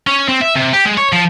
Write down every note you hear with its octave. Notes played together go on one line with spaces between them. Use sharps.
C#4
C4
E5
C3
G4
G#3
C#5
F3